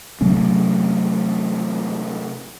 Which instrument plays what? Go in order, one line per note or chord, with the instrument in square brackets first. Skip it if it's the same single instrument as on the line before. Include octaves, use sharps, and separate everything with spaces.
[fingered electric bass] C3 F#3 A3 C#4